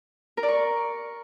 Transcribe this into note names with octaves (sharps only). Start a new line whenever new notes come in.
A#4
D5
C#6